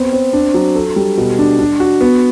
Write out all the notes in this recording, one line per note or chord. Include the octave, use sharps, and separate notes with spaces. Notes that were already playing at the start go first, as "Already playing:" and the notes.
Already playing: B3 C4
C4
D4
F#3
A4
G3
B2
D4
D4
F#4
B3